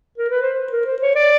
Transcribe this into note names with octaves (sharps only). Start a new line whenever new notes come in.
A#4
B4
C5
A#4
C5
C#5
D5